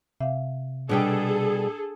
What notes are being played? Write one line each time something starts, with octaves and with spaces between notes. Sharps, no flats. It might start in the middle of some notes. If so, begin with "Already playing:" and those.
C3 E5 F5
B2 G3 D4 G#4 A4 G5